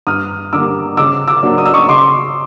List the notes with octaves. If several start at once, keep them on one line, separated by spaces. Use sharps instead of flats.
G2 D#6 F6
D3 G3 A#3 D6 E6
C#3 D6 E6
D6 E6
F#3 A#3 D4
D#6
E6
C#6 D#6
C#3 C6 D6